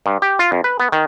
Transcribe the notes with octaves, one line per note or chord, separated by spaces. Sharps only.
G2
G4
F4
F2
B4
B3
D#3